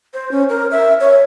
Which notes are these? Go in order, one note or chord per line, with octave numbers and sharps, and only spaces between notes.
C5
C#4
A#4
E5
C#5